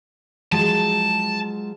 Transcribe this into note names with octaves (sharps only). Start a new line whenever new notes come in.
F3 F#3 G#3 A5